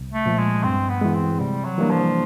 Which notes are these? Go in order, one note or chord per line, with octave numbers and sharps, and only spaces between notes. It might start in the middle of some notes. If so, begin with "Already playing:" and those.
Already playing: C2
A3
A#2 F3
G#3
G2 C4
B3
E3 G#3
C4
C3 G3
F#3
E3 G3 A#3 D4
F3